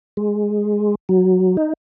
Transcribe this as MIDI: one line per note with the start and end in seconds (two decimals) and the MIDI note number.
0.17 0.95 56
1.09 1.57 54
1.57 1.73 63